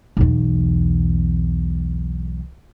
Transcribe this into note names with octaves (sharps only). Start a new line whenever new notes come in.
B1 E2